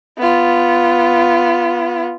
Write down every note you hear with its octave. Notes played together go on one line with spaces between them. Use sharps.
B3 F4